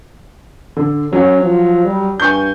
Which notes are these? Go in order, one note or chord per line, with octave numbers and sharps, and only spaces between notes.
D3
F#3 C#4 F#5
F3
G3
G2 G#5 C#6 G6